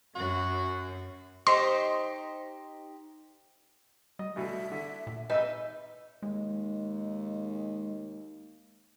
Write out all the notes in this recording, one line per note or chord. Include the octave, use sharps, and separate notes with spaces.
F#2 F#4
D#4 G4 C5 C6
G3 D#5
D2 B2 D3 E5
D3
A#2
G#1 D#4 B4 E5 E6
D#2 G#3